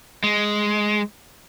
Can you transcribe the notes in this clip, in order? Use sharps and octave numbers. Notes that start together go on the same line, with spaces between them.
G#3